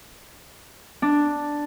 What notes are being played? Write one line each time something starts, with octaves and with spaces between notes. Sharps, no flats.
D4